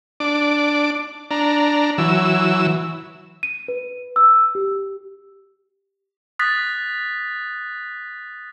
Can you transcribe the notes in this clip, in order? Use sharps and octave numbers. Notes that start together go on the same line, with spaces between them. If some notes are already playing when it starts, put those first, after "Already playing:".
D4 D6
D4 A#5
E3 F#3 E6
D#7
B4
E6
G4
D#6 F#6 A6 B6